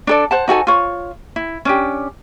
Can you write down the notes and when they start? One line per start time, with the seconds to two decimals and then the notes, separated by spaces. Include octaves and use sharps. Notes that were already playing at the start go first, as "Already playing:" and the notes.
0.07 D4 A4 D5
0.31 C5 F#5 A5
0.48 D#4 F#4 A4 G#5
0.67 F4 C#5
1.36 E4
1.65 C#4 D4 G4